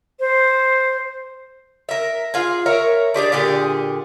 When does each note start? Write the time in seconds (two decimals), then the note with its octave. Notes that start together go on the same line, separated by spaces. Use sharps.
0.20 C5
1.89 A#4 E5
2.34 F4 G#4
2.66 A#4 C#5 E5 A#5
3.14 D4 G4 G#4 D5
3.32 A#2 D3 G4 G#4